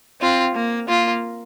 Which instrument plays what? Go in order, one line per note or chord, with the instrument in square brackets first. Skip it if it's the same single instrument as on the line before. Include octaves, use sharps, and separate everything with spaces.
[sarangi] C4 [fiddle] F4
[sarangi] A#3
[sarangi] A#3 [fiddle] F4